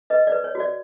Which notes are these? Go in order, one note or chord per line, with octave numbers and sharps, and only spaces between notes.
B4 D#5
B4 D5
C#5
F#4
D5